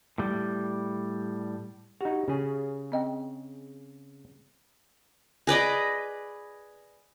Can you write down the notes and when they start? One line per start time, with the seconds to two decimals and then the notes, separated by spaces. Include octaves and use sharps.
0.18 A2 G3
2.01 D#4 F#4 G4
2.28 C#3 G#4
2.92 C4 D#5 G5
5.47 G#4 B4 D5 D#5